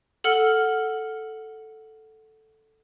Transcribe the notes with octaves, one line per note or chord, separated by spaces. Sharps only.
A4 F#5 F6 C#7 G7